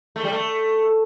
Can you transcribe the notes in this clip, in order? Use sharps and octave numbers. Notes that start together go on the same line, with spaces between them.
A3
G3
A3